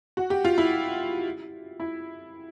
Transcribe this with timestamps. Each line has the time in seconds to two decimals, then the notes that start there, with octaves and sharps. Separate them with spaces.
0.17 F#4
0.30 G4
0.45 F4
0.58 E4
1.80 E4